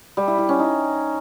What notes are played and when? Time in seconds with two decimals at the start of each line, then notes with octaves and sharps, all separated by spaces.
0.17 G3
0.28 E4
0.38 E4
0.49 C#4
0.59 D#4